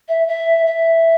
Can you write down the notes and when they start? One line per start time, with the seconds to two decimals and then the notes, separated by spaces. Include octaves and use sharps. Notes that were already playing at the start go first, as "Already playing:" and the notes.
0.08 E5
0.28 E5
0.66 E5